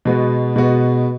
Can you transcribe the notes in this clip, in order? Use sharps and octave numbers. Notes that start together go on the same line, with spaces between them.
B2 G#3 B3 F#4
B2 G#3 B3 F#4